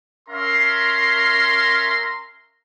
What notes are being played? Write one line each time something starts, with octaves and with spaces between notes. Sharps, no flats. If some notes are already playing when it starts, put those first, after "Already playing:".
C#4 A#4 E5 F5 A#5 C6